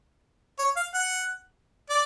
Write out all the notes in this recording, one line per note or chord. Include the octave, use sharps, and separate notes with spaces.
C#5
F5
F#5
D5